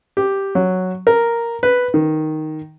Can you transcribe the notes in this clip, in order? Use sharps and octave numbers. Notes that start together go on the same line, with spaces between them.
G4
F#3
A#4
B4
D#3